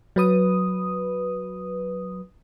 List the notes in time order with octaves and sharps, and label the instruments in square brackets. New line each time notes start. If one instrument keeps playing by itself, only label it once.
[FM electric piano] F#3 B4 D#6